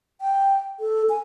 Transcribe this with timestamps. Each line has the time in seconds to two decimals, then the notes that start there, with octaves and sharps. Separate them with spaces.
0.21 G5
0.80 A4
1.09 G#5